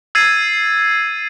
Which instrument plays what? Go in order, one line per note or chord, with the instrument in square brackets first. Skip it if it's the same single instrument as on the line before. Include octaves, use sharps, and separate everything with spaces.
[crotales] E6 G#6 A6 C7 D#7